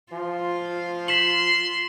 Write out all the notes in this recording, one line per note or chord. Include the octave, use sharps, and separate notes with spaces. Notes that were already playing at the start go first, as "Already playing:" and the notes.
F3 F4
C6 B6 E7 F#7